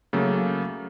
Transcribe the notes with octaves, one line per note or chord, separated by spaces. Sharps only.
C#3 F#3 A3 A#3